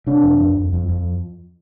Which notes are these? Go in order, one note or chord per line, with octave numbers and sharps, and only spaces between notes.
C3 D4
F2
F2
F2
F2
F2